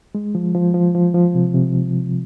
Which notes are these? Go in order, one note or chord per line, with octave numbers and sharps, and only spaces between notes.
G#3
F3
F3
F3
F3
F3
C3
C3